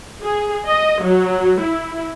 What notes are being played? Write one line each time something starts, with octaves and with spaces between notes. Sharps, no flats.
G#4
D#5
F#3
E4